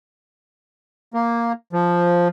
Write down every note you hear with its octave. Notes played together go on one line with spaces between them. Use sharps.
A#3
F3